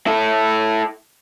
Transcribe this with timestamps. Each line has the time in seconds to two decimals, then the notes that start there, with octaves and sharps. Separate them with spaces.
0.07 E4 A4